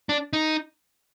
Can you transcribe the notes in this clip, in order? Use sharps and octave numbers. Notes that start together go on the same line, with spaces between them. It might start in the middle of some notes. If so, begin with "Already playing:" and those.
D4
D#4